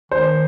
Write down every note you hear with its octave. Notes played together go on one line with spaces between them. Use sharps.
D#3 C5